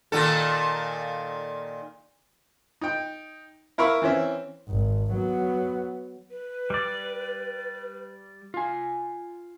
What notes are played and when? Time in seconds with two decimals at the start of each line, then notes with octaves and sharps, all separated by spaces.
0.12 A#2 D#3 A4
2.81 D#4 G5
3.78 E4 A#4 F5 B5 C#6 E6
4.02 E3 C4 C#4 E5
4.68 G#1
5.13 F#3 B3
6.31 B4
6.70 G3 D5
8.54 F4 G#5